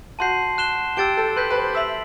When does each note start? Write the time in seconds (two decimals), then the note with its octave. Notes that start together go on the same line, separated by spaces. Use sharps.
0.19 F#4 A5 C6 G6 C7
0.58 F#6 C7 E7 G7
0.97 G4 E6 A6 D7 G7
1.17 A4
1.36 B4 C6 G6 B6
1.51 B4
1.56 C5
1.75 E5 E6 B6 F#7